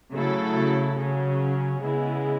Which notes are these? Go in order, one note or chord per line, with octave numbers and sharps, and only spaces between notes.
C#3 F#3 A3 E4 A4
C#3 F#3 C#4
C#3 G#3 B3 E4